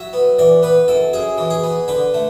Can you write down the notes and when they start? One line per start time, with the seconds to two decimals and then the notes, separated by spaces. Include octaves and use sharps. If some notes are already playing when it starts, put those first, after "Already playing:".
Already playing: F#3 E5
0.13 B3
0.39 E3 D5
0.63 B3 B4
0.88 F#2 A4
1.13 F#2 G#4
1.38 E3
1.50 G#4
1.63 B3
1.88 D3 B4
2.14 A3